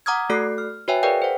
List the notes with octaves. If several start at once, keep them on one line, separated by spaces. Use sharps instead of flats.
F#5 A#5 D6 D#6 F6 G#6
A3 F#4 A4 D5 F#6 C7
F6
F#4 B4 C#5 E5 G5 G#5
G#4 A#4 B4 D5 F5 G5
C5 F#5